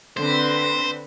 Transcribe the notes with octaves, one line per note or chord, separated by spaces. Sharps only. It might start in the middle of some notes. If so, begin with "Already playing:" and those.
D3 C4 B4 C5